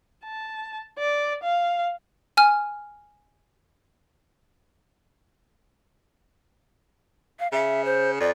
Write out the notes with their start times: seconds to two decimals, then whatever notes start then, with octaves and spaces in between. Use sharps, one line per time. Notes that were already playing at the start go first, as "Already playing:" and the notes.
0.25 A5
0.98 D5
1.43 F5
2.37 G#5 F6
7.40 F5
7.52 C#3 E5
7.85 C5
8.20 F2 D5